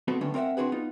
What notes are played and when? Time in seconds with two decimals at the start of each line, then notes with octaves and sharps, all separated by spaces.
0.08 B3 C4 F#4 A4
0.21 D3 G3 A3 B3 C#4 D4
0.34 C4 A#4 D5 E5 F#5
0.57 C4 D4 F#4 G#4 B4
0.72 B3 D#4 F4